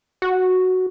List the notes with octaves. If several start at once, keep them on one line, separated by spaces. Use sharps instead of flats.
F#4